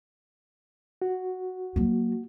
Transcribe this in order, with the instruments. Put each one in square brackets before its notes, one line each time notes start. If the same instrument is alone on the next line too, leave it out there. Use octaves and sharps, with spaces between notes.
[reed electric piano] F#4
[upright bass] F#3 A#3